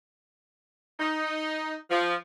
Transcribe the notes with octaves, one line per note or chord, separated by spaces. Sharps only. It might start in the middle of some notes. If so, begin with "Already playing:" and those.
D#4
F3